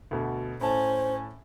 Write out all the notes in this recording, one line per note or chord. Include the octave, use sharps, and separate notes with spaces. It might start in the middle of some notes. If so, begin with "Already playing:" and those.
D2 B2
A2 C#4 C5 A5